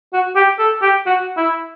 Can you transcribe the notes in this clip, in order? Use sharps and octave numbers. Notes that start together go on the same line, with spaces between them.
F#4
G4
A4
G4
F#4
E4